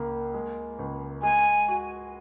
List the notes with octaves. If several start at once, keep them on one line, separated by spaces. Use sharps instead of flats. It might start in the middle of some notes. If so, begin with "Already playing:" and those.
Already playing: C#2 A#3
G#3
C#2
G#3 G#5
F#4